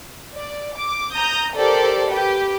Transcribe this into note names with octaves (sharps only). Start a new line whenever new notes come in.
D5
D6
A#5 D#6 G6 A#6
G4 A4 A#4 C5 D5
G4 B4 G5